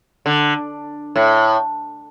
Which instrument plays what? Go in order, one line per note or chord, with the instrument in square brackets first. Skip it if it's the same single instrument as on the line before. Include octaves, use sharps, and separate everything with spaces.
[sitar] D3
A2